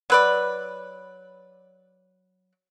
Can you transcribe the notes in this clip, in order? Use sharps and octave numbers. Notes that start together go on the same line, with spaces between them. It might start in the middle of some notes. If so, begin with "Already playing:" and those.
F#3 B4 D5